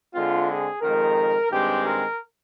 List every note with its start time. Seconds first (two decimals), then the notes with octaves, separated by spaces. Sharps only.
0.13 D3 G#3 C4 F4
0.48 G#4
0.81 F2 D#3 G#3 A#4
1.49 G2 D#3 G#3 C4 G4
1.83 A#4